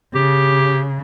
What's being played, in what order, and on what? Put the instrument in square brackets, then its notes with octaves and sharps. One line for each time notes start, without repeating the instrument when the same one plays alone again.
[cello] C#3 [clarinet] G4